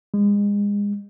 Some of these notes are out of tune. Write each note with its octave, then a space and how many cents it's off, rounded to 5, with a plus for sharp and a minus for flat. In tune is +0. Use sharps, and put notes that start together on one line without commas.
G#3 -30